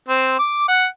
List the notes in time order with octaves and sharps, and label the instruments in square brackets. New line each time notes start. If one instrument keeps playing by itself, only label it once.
[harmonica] C4
D6
F#5